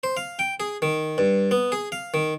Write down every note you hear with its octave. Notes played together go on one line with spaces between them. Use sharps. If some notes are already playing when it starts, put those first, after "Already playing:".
C5
F5
G5
G#4
D#3
G2
B3
G#4
F5
D#3